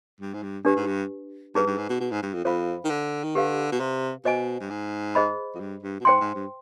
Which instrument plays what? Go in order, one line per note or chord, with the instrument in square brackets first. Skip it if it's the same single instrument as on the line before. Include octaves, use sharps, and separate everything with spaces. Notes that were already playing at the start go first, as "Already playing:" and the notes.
[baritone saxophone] G2
G#2
G2
[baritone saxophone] G2 [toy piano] D4 G4 B4
[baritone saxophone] G#2
G2
[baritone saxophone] G2 [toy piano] D#4 G#4 B4
[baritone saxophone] G2
G#2
B2
B2
G#2
G2
F2
[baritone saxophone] F2 [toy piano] C5 F5 B5
[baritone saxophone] D#3
D3
D#3
[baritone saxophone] D3 [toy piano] G4 B4 F5
[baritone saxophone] B2
C3
[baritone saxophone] B2 [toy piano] C5 D#5 G#5
[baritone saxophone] G2
G#2
[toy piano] G#4 C5 D#5 B5
[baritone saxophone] F2
G2
G2
B2
[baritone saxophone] G#2 [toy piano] C5 G5 C6
[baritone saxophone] G#2
G2